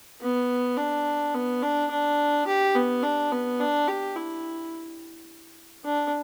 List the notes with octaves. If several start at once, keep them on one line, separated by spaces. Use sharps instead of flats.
B3
D4
B3
D4
D4
G4
B3
D4
B3
D4
G4
E4
D4